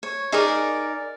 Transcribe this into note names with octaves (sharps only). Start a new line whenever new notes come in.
C#5
D#4 G#4 A#4 D5